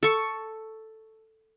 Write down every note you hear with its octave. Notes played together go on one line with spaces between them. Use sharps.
A4 C#6